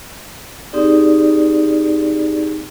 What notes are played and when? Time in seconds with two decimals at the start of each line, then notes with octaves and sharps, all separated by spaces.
0.73 C4 D#4 G4 G#4 D5